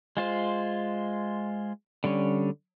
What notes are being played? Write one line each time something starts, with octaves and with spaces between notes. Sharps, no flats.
G#3 F4 C5
D3 G3 C#4